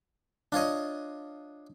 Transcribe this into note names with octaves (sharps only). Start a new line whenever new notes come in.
D4 F4 C#5 D#5